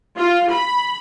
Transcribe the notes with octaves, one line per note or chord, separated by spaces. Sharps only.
F4
B5